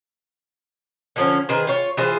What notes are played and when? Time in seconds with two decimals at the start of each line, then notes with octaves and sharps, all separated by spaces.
1.16 D3 F3 C#4
1.49 D#3 G#4 B4 C5
1.67 F4 C#5
1.97 E3 F4 G#4 C5